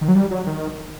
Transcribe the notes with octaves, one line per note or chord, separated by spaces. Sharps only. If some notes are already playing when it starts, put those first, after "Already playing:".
D#3
F#3
G3
F#3
D#3